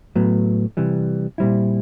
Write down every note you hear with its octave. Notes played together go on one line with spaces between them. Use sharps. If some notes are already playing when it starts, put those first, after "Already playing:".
A2 F#3 B3
C3 E3 G3
A#2 G3 C4 E4